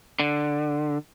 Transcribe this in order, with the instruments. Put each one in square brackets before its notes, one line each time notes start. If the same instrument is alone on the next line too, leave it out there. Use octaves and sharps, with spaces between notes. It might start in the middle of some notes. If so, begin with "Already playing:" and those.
[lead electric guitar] D3